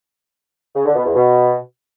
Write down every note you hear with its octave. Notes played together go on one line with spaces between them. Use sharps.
C#3
D3
B2
E2
B2